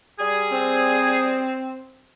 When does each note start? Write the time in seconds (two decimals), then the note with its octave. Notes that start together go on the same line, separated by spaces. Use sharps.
0.19 G3 G#4
0.52 C4